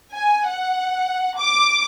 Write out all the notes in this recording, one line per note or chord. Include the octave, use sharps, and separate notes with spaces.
G#5
F#5
D6